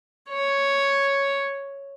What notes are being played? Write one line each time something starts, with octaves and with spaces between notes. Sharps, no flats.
C#5